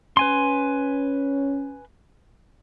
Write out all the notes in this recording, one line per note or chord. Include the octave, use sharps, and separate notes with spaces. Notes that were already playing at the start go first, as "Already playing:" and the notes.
C#4 B4 G#5 C6